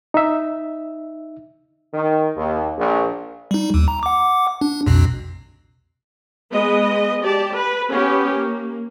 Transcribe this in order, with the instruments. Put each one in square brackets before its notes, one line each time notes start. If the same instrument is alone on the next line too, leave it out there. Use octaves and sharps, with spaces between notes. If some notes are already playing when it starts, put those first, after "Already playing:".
[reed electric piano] D#4 E5
[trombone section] D#3
D#2
A#1
[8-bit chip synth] G3 D#4
D#2
A#5
F#5 D6
D4
B1 F2 B2
[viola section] G#3 B3 B4 D#5
G4 D5 A5
B4
B3 C#4 G4
A#3